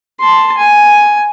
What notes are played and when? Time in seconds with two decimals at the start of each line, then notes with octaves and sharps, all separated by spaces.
0.20 A5 C6
0.58 G#5